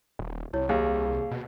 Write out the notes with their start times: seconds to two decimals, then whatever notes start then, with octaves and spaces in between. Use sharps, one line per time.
0.19 D#1
0.53 C2 E4 C#5
0.69 D#2 G#4 F5
1.31 B2